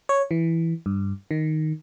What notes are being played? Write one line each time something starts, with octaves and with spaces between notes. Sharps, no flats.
C#5
E3
G2
D#3